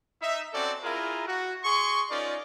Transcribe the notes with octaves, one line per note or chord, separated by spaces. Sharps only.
D#4 E5
C4 C#4 F#4 A4 D5
E4 F4 G#4 A#4
F#4
G#4 C6 C#6
C#4 D#4 F4 A#4 D5